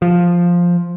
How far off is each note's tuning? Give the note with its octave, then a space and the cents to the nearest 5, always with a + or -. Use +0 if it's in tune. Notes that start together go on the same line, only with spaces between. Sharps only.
F3 +5